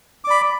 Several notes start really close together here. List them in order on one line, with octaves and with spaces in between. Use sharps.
D6 D5 B5